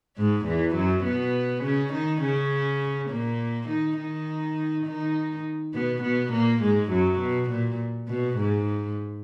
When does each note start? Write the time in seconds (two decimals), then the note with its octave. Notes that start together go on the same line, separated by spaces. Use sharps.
0.17 G#2 G#3
0.46 E2 E3
0.75 F#2 F#3
1.05 B2 B3
1.63 C#3 C#4
1.93 D#3 D#4
2.22 C#3 C#4
3.10 A#2 A#3
3.68 D#3 D#4
3.98 D#3 D#4
4.86 D#3 D#4
5.74 B2 B3
6.03 B2 B3
6.32 A#2 A#3
6.62 G#2 G#3
6.91 F#2 F#3
7.20 B2
7.50 A#2
8.08 B2
8.38 G#2